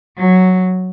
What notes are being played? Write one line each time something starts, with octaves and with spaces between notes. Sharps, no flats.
F#3